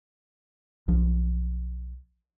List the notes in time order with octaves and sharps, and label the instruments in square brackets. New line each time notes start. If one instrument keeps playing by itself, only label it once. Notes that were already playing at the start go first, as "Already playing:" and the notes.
[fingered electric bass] B1 F3